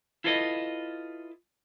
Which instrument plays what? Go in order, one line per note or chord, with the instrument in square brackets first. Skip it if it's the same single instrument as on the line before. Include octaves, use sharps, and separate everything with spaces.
[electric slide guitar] E4 F4 A4 B4 C5 D#5